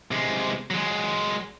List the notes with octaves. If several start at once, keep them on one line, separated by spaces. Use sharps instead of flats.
C3 G#3
F#3 G#3